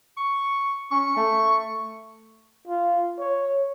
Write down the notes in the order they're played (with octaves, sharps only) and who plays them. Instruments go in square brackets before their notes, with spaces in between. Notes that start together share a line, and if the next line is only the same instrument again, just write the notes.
[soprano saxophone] C#6
[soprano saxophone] C#4 [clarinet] C#6
[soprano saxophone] A3
[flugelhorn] F4
C#5